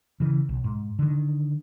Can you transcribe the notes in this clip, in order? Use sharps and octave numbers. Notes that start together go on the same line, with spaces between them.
C#3 E3
B1
G#2
D3 D#3